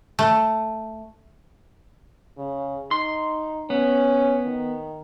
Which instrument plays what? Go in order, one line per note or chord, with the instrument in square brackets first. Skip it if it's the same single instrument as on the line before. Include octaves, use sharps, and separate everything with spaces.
[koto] A3
[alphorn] C#3
[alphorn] D#4 [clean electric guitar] C6
[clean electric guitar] B3 [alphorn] C#4
[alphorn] D#3